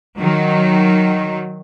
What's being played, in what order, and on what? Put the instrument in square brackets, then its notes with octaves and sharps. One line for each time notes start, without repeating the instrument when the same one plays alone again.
[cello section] D#3 F#3